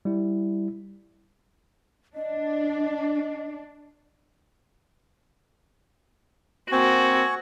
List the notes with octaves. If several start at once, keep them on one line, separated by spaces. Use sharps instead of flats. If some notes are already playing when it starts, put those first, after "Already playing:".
G3 E4
D4 D#5
A#3 C4 F#4 G#5 C#6